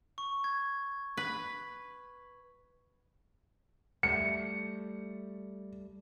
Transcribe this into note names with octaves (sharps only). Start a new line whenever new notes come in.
C#6
G#6
B4
G3 A3 C#7